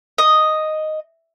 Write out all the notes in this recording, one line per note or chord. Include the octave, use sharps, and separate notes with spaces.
D#5